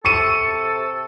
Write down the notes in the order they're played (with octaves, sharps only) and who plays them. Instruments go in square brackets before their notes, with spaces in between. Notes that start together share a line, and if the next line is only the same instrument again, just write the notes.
[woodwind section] C3 A4 [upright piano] C#6 C#7 D#7